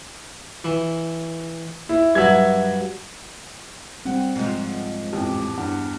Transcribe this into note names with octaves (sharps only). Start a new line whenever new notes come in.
E3
E4
G2 F#3 E5 G#6
G3 C4 F#5
G#2 F3
A1 F2 G4
E2 G2 F#5